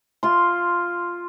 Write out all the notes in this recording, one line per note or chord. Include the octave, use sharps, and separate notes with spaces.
F4 C6